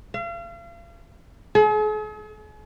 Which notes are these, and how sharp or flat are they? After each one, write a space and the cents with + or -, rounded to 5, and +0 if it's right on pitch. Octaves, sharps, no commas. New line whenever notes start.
F5 -40
G#4 +45